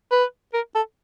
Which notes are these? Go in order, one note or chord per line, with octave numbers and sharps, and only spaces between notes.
B4
A#4
A4